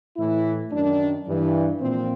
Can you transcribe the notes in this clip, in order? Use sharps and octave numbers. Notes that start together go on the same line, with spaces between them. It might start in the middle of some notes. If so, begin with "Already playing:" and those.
A2 E3 E4
F#2 D#3 D4
G2 E3
A#2 F3 C4